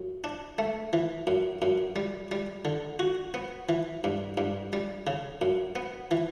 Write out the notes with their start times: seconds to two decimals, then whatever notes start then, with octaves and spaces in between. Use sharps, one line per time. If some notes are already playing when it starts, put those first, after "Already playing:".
Already playing: F#2
0.24 D4
0.58 A3
0.93 E3
1.27 F#2
1.62 F#2
1.96 G3
2.32 G3
2.65 D3
2.99 F#4
3.34 B3
3.69 E3
4.04 G2
4.37 G2
4.73 G3
5.07 C#3
5.41 F#2
5.76 B3
6.11 E3